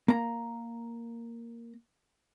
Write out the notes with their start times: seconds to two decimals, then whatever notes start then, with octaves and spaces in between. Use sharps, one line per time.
0.08 A#3 A#5